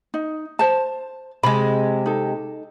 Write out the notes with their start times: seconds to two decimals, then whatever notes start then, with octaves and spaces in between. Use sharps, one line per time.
0.14 D#4
0.59 C5 A5
1.43 C3 G#3 B5
2.06 D#4 A4